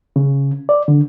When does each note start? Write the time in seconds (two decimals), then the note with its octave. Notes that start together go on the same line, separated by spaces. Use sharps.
0.16 C#3
0.69 D5
0.88 D3